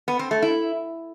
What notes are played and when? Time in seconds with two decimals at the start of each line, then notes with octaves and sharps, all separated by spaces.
0.08 B3
0.19 C4
0.31 A3
0.42 E4